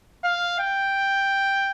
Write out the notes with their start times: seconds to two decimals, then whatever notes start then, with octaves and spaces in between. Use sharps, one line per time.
0.24 F5
0.59 G5